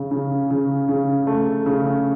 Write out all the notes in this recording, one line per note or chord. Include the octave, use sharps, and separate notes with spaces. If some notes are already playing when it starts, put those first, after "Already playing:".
Already playing: C#3
C#3
C#3
C#3
A3
C#3